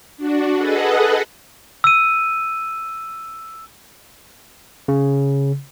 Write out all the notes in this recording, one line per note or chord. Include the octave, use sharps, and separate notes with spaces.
D4 F#4
G#4 A4 B4 D#5 F#5
E6 D#7
C#3